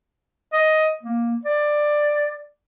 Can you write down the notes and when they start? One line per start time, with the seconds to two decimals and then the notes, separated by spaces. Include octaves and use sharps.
0.53 D#5
1.03 A#3
1.45 D5